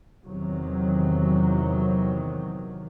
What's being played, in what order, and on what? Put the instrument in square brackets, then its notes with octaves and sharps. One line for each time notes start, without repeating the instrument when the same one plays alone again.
[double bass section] E2 C3 D#3 F#3